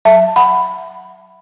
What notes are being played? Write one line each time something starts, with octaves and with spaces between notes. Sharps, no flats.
F#3 E5 A5
F#3 F#5 B5